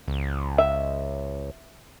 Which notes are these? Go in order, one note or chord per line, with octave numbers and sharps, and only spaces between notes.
C#2
E5